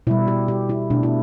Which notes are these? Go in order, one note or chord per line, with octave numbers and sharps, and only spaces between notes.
B2 G3 E4
G4
G4
E4
B2 A3 D4
E4